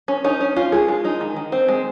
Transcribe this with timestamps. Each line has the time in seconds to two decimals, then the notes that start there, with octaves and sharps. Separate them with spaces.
0.08 C#4
0.24 C#4 D#4
0.41 C#4
0.56 C#4 F4
0.72 G#3 G#4
0.88 G#3 F4
1.04 G#3 D#4
1.21 D#3
1.37 D#3
1.52 C4
1.68 G#3